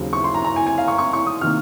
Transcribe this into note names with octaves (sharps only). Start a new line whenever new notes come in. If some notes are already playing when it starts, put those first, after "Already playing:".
Already playing: D#2 C#3 F#3 C4
C#6
C6
A#5
A#5
G#5
G#5
F5
C#6
C#6
C#6
D#6
C3 D#3 A#3 D#4 F6